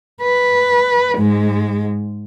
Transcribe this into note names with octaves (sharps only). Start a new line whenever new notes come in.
B4
G#2 G#3